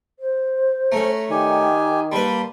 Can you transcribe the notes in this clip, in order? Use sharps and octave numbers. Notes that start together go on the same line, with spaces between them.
C5
A3 C#4 A#5
D#3 G4 D5 G#5
G3 A#3 B4 A5 B5 C6